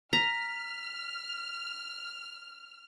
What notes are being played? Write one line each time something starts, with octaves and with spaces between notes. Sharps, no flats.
A#5 F6 B6